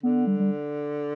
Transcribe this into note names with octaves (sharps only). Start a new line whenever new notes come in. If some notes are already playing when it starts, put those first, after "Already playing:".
D3 B3
G3
G3